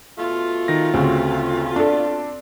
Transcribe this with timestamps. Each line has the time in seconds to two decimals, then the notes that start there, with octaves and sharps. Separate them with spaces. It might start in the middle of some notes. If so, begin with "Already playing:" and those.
0.18 B2 A3 F4
0.68 D#3 A#6
0.94 D2 C#3 C4 F#4
1.76 D4 A4